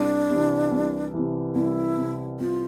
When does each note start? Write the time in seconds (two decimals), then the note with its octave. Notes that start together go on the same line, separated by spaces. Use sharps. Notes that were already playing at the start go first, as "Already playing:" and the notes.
Already playing: C2 D4
0.30 C3 E3
0.71 C2
1.14 C3 E3
1.55 C2 E4
1.98 C3 E3
2.40 C2 F4